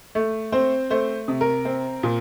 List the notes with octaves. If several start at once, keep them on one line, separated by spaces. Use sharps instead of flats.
A3
C4 C5
A3 C5
C3
A#4
C4
A#2